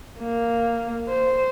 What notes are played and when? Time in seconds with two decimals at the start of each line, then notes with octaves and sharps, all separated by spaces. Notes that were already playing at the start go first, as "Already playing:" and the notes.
0.19 A#3
1.09 C5